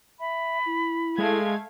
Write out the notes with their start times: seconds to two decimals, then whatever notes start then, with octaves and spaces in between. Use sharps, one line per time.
0.20 E5 B5
0.66 E4
1.18 G#3 A3 F5 G#6